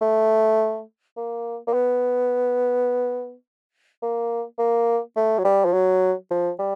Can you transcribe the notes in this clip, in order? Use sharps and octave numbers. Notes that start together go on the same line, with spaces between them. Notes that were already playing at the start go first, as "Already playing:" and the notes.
A3
A#3
A#3
B3
A#3
A#3
A3
F#3
G3
F3
F#3
F3
G3